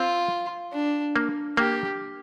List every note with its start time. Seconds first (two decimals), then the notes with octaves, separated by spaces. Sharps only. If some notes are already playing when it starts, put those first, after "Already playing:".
Already playing: C4 F4
0.73 D4
1.16 A#3
1.57 A#3 G4